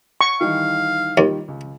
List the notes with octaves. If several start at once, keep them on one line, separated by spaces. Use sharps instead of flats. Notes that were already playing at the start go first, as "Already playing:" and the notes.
C#6
D#3 E3 G3 F5
D#2 D#3 G3 F4
C#2